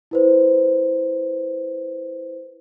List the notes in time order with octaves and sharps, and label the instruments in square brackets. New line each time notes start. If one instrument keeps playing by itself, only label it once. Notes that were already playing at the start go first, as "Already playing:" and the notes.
[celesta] E4 B4 C5